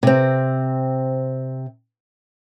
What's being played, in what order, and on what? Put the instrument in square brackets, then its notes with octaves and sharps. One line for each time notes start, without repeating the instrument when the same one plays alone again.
[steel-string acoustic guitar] C3 C4